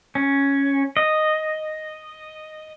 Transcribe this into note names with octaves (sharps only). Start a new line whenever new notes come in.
C#4
D#5